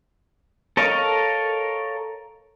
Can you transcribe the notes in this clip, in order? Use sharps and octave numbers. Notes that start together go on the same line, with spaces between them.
A4 A#4 C#5 D#5 F5